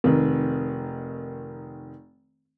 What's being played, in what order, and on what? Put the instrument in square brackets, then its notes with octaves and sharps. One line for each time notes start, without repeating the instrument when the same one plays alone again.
[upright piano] F1 D#3